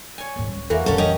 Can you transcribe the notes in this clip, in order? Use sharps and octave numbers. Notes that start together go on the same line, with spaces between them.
C#5 G#5
D#2 G#2
C#2 G3
E2 E3 A#3 F#4 A4 E5
F2 A2 D3 C#4 A4
A#1 E3 C#4 G4 D#5 G5